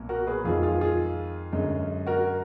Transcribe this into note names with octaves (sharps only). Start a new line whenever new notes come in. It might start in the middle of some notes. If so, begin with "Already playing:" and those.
Already playing: B1 A#2
F#4 A#4
G#4 B4
F2 D#3 G#3 F4 G#4
F4 G#4
F4 G#4
F#2 D3 G#3
F#4 A#4